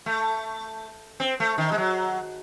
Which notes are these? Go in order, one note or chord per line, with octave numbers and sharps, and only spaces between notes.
A3
C4
A3
D#3
G#3
F#3